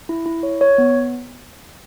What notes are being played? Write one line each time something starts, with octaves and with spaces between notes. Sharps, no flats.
E4
E4
C#5
C#5
B3